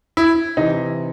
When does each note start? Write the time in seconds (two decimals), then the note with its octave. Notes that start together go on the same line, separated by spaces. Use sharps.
0.17 E4
0.57 C3 E3 D#4